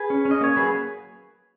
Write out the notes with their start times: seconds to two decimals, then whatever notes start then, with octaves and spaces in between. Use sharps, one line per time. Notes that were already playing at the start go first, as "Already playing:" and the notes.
Already playing: G#4 B4
0.10 C#4
0.25 C#4
0.31 D#5
0.41 A#3 C#5
0.56 F#3 G#4 B4